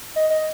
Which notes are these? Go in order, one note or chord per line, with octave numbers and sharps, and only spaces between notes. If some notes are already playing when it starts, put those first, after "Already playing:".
D#5
D#5